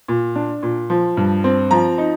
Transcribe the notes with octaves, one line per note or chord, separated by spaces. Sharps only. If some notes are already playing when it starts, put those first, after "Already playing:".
A#2
D4
A#2
F3
G2
C4
F3 A#5
D#4